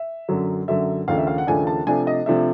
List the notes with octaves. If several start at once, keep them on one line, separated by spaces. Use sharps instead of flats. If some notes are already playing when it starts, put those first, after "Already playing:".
Already playing: E5
F#2 D3 F#3
F#2 D3 F#3 E5
D#2 C#3 F3 A3 D4 F5
E5
F5
F#5
D#2 C#3 F3 A3 D4 G#5
A5
C3 F3 A3 D4 G#5
D#5
C3 F3 A3 D4 E5